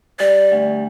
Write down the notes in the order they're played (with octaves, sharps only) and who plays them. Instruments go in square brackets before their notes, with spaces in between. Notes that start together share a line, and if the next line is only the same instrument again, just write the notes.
[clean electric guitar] G3 [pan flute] D5
[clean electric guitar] D2